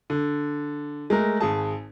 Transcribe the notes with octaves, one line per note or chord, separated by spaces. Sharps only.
D3
G#3 A3 A#4
G#1 G#4 A5